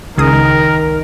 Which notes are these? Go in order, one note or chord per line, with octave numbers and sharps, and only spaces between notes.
C#2 D#3 G#4 A#4 D#6